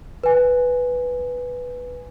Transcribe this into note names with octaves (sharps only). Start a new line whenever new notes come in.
B4 G#5